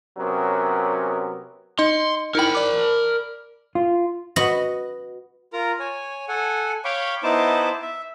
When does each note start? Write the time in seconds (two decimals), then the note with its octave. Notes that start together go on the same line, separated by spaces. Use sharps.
0.18 C3 F#3 B3 C#4 A#4
1.79 D#4 D#5 C6
2.35 D#4 E4 A#4 G5 B5
2.55 D5 D6
3.75 F4
4.36 F#4 B4 D#5 F#5
5.53 F4 A#4 A#5
5.80 C#5 G#5
6.29 A4 F#5 G#5
6.85 C#5 F5 G5 B5 C#6 D6
7.23 B3 D#4 E4 C5 A5 D6
7.82 E5